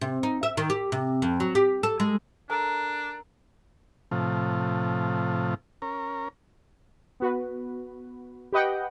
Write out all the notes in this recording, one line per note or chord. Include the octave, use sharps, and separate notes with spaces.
C3
D#4
E5
D#3
G4
C3
F2
F#3
G4
A4
G#3
D4 A4 A#4 A#5
A2 C3 F3
C#4 A#4
B3 F#4 B4
G4 B4 D#5 F#5 G5